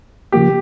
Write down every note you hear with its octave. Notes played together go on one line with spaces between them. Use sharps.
C#3 F3 A#3 G4